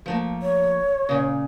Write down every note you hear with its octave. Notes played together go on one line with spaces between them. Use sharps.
F3 A3 A#3
C#5
A#2 C#3